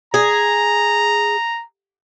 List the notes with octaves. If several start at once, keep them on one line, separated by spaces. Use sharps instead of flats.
G#4 A#5